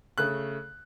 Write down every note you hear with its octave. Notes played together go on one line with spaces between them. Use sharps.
C#3 A3 F#6